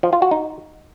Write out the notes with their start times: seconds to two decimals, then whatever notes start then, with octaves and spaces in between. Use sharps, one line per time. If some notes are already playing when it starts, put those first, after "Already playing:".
0.03 F3
0.13 F4
0.22 F#4
0.31 D#4